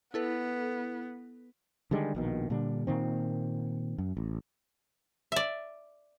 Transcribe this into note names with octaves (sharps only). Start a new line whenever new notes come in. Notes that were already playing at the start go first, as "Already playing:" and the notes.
B3 E4 A4 B4
D3 D#3 G3 G#3
A#1 B2 D#3
A#2 D3 G3 D4
A#2 D#3 C4
F#2
A1
D5 E5